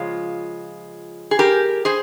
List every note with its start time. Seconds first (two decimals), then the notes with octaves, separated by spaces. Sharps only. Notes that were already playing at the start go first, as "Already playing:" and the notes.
Already playing: C#3 F3 G#3 F4
1.31 G#4
1.39 G4 A#4
1.85 G#4 C5